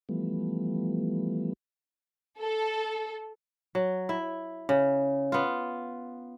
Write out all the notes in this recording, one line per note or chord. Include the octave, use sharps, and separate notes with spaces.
E3 F3 G3 A3 B3
A4
F#3
E4
C#3
B3 F4